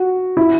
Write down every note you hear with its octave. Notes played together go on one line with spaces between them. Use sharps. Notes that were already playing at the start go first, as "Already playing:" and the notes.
Already playing: F#4
E4